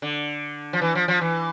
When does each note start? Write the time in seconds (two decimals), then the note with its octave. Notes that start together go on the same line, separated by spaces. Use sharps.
0.02 D3
0.73 F3
0.82 E3
0.95 F3
1.08 F3
1.21 E3